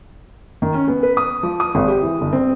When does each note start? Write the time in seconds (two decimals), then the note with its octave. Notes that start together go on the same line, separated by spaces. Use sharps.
0.62 D#3
0.74 C#4
0.88 B3
1.03 B4
1.17 D#6
1.43 F3
1.60 D#6
1.75 G#1
1.88 G4
2.02 E3
2.21 G1
2.33 C4